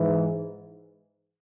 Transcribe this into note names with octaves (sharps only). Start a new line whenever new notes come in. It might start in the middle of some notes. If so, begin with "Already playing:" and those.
Already playing: G#2 E3